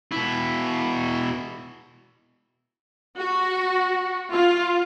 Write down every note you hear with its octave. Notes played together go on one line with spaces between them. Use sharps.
B2 E4
F#4
F4